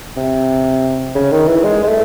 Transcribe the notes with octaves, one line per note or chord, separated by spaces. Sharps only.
C3
C#3
D#3
E3
G#3
G#3
A3